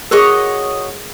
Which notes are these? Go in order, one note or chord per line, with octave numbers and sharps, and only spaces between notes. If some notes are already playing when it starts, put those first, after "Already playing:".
F#4 G#4 A#4 C#5 D#5